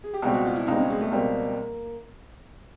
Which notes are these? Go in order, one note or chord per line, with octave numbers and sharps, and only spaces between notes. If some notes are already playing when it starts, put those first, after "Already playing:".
G#4
G4
C#2 B2 G3 C4 F#4
F#4
F4
E4
C#2 B2 G3 C4 D#4
C#4
G#3
A3
C#2 B2 G3 A#3 C4